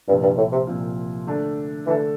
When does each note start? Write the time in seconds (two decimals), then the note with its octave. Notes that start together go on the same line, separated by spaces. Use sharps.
0.08 C2 G2 A#2 F3 C4 F4
0.23 G2
0.37 A2
0.52 C3
0.67 C2 A#2 F3 C4 F4
1.27 D3 A3 D4 A4
1.86 D3 E3 A3 D4 A4